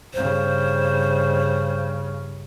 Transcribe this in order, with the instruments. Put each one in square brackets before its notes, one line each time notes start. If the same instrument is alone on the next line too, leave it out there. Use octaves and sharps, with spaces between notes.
[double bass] G2 C#3 [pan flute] C5